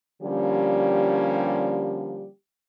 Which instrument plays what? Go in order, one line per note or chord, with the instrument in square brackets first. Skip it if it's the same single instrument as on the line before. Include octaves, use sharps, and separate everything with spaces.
[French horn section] D3 F3 G3 A#3 C#4 G4